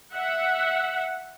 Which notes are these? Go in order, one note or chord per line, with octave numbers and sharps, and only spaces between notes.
E5 F#5